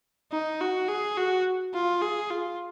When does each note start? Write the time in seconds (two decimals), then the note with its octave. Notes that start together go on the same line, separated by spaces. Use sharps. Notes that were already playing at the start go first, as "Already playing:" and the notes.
0.32 D#4
0.60 F#4
0.88 G#4
1.17 F#4
1.74 F4
2.02 G#4
2.30 F4